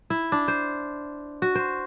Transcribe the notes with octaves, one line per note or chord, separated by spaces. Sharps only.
E4
D4
C5
F#4
C5